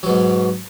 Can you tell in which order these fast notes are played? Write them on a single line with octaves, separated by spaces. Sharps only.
F#3 B2 G#2